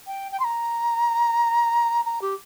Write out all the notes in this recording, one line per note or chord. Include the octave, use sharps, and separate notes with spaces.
G5
G5
C6
A#5
A#5
G4